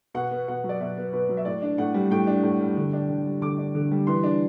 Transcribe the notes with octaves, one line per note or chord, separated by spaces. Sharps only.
B2 F#5
B3
B2 F#5
F#3
D5
B2 E5
B3
B2 B4
F#3
E5
A2 D5
D4
A2 F#5
G3
A2 G5
D4
A2
G3
D3
D4
D3
G3
D3 D6
D4
D3
G3
E3 C6
D4